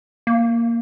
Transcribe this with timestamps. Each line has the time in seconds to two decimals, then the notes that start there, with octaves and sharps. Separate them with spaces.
0.27 A#3